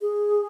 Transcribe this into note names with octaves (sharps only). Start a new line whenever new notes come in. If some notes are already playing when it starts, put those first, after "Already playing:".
G#4